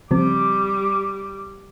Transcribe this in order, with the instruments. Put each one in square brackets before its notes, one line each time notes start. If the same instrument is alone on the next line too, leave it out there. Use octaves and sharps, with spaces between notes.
[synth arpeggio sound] C#3 F3 C4 [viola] G3 D6